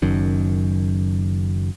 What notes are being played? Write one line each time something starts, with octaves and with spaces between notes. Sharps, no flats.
F#1 F#2 D#3